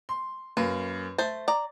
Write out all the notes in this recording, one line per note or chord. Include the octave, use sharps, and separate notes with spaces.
C6
F#2 A#3 B4
A3 C5 A6
D5 A#5